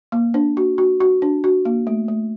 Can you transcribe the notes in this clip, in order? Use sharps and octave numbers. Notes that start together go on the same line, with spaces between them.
A#3
D4
F#4
F#4
F#4
D4
F#4
A#3
A3
A3